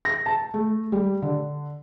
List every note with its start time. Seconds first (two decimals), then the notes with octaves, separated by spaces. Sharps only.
0.05 A#6
0.26 A5
0.54 A3
0.92 G3
1.22 D3